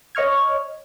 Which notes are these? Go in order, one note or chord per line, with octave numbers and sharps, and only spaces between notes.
C#5 D#5 C#6 F6 G#6